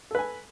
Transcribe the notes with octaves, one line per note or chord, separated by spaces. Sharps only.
A4 B4 G#5